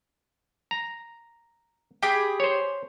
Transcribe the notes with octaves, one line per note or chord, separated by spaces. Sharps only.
A#5
G4 G#4 G5 B5
C5 C#5